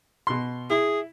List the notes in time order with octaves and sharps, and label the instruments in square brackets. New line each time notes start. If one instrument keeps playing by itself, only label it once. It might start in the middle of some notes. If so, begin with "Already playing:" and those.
[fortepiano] B2 C6
[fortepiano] E4 [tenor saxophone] G#4